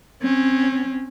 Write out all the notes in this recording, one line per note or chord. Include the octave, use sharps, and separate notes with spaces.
C4 C#4